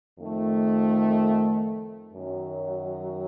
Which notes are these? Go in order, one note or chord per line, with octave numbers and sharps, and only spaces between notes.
F2 D#3 A3
F#2 D#3 F#3